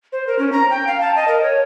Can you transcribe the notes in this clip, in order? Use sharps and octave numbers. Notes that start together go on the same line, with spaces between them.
C5
A#4
C#4
A#5
G5
F5
A5
D#5
A#4
C#5